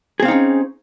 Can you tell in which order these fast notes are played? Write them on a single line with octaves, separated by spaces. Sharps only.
G#4 C4 F5 D#4 C#4